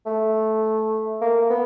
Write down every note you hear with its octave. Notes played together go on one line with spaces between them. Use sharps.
A3
A#3
B3